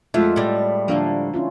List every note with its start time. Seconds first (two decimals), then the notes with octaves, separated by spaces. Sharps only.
0.14 F2 G#3 A3 F4 F#4 E5
0.36 A2 G3
0.88 D3 F3 A3 A#3 D4 F5
1.34 C#4 E4 F4